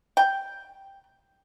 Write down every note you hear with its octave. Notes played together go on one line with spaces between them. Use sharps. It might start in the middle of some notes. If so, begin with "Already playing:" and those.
G5